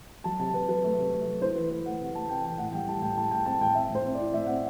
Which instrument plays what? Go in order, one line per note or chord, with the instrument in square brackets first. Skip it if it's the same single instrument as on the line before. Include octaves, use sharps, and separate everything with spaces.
[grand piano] F#3 A5
C3 A5
C3 B4
F#3 B4
A3
C3
A3
F#3
E4 C5
E3 B4
A3 B4
A3 F#5
C3
A3 A5
C3 G5
E3 G5
A2 F#5
G3 G5
G3 A5
A2 G5
A2 A5
A2 G5
C4 A5
A2 G5
C4 E5
A2 C5
C4
D5
E4
A2 E5
C4 F#5